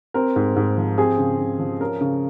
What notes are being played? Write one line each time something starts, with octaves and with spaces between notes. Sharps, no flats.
C4 A#4
G#2
G#2
F3
C4 G#4
C#3
C#3
F3
C#4 A#4
C#3